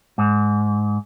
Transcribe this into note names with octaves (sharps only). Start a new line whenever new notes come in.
G#2